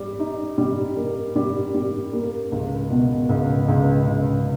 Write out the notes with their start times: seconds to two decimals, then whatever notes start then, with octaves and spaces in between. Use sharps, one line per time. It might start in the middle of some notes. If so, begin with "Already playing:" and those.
Already playing: G3
0.20 D#4
0.58 G3
0.97 A#3
1.36 G3
1.75 G3
2.13 A#3
2.52 C#2
2.90 B2
3.29 C#2
3.68 C#2
4.07 C#2